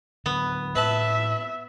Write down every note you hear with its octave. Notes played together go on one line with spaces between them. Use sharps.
D3 F#3 B3
A2 B4 E5 A5